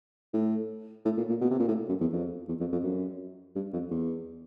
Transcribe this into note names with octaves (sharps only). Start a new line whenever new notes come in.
A2
A2
A#2
A#2
B2
C3
A#2
A2
F#2
E2
F2
E2
F2
F2
F#2
G2
F2
E2